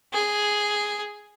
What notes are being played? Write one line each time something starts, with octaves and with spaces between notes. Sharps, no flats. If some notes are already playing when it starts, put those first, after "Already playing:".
G#4